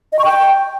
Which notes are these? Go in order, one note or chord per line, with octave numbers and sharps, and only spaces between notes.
D#5
C#6
G5